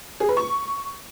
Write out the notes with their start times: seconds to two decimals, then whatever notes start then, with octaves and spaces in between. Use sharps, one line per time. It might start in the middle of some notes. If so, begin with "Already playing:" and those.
0.20 G#4
0.29 B4
0.37 C#6